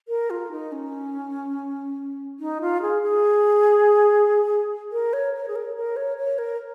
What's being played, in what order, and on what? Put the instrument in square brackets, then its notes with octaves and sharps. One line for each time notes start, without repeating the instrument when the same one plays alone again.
[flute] A#4
F4
D#4
C#4
D#4
F4
G#4
G#4
A#4
C#5
C#5
G#4
A#4
A#4
C#5
C#5
A#4